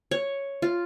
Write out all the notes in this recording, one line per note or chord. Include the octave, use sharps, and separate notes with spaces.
C#5
F4